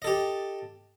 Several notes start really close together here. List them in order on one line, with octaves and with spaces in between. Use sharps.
D#5 A4 G4